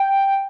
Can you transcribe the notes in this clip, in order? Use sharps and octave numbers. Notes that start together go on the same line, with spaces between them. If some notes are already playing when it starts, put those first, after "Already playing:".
Already playing: G5